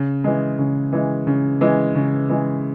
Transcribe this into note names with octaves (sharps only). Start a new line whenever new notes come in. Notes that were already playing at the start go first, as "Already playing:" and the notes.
Already playing: C#3
E3 G#3
C#3
E3 G#3
C#3
E3 G#3
C#3
E3 G#3